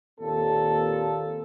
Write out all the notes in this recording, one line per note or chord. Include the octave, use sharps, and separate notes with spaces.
D#2 A#2 C4 A4